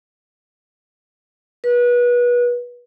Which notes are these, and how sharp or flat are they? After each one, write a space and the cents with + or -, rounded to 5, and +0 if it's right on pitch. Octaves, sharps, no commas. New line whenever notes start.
B4 -30